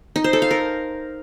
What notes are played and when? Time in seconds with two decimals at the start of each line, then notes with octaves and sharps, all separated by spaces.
0.16 D#4
0.24 C5
0.33 A4
0.42 F5
0.51 A#4